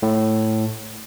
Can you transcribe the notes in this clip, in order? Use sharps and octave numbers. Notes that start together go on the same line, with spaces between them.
A2